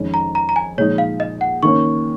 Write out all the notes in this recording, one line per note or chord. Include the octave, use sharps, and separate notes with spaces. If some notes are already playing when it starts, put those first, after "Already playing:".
Already playing: F2 D#3 G#3 C#4
A#5
A#5
A#5
G#5
A#2 F3 G#3 D#4 C#5
F5
D#5
F#5
D#3 A#3 C#4 C#6